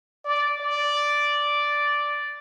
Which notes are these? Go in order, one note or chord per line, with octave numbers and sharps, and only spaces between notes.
D5
D5